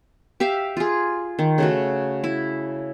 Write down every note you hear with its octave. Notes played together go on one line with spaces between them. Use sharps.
G4 E5 F5
F4 G#4
D#3
C#3 A3 F#4
E4